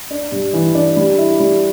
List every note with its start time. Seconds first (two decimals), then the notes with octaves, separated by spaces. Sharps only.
0.11 D4
0.32 G2
0.53 E3
0.75 D4
0.97 G3
1.18 E4
1.40 G3